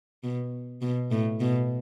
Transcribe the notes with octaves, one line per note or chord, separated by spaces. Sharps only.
B2
B2
A2
B2